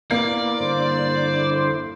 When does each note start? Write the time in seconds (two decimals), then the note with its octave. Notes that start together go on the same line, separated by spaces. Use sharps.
0.11 A#3 B3 E4 D5 C7
0.60 G2 D3 E4 C5